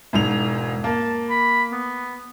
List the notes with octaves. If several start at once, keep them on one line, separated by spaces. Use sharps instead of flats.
E1 G#2 F7
A#3 A5
B5
B3